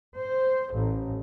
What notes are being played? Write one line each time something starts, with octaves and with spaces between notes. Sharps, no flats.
C5
A1